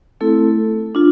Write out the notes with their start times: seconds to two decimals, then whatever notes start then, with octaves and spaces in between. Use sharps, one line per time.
0.21 A3 C4 E4 A4
0.95 D4 F4